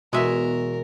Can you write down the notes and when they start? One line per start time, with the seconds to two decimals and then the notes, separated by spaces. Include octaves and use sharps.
0.13 E2 B2 G#3 F#4 A#4 E5